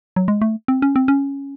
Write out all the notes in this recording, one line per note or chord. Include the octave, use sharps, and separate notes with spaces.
F#3
G#3
A3
C4
C#4
C4
C#4